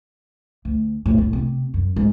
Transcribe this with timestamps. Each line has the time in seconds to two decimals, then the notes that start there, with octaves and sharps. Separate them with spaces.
0.65 D2
1.06 A2
1.18 A2
1.33 C3
1.74 F#2
1.96 G#2